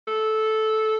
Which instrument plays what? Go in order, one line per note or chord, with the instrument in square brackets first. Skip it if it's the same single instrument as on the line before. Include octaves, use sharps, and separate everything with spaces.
[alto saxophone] A4